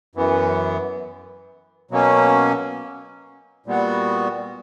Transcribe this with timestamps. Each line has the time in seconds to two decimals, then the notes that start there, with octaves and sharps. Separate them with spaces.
0.15 F#2 E3 B3
1.91 B2 F#3 A#3 C#4
3.66 A#2 G3 B3 F#4